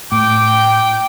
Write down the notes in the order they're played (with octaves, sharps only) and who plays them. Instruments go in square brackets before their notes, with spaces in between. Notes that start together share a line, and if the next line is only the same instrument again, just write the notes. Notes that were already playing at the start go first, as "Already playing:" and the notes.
[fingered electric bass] A2 [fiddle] G5 [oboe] D6